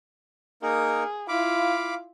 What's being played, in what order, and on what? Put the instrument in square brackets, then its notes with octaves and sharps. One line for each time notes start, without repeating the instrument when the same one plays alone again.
[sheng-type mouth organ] A#3 D#4 A#4 [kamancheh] G#4
[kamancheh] E4 F4 [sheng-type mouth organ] F5 B5 D6